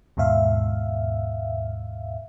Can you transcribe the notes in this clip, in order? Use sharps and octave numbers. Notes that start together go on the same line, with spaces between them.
D#2 G#2 B2 E5 F5